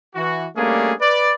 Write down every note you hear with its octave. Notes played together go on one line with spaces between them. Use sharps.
E3 F#4
G3 A3 A#3 C#4 D4 G#4
B4 D5